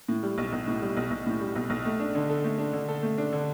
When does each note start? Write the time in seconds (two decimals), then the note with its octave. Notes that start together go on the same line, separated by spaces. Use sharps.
0.09 A2
0.23 G3
0.38 B1
0.53 B1
0.67 A2
0.82 G3
0.97 B1
1.11 B1
1.26 A2
1.41 G3
1.56 B1
1.70 B1
1.85 A3
2.00 D4
2.15 D3
2.29 A4
2.44 A3
2.59 D4
2.73 D3
2.88 A4
3.02 A3
3.18 D4
3.33 D3